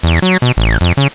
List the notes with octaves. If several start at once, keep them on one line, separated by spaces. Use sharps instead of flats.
E2
F#3
B2
A1
F2
C#3